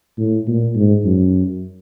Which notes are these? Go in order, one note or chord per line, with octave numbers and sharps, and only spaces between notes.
A2
A#2
G#2
F#2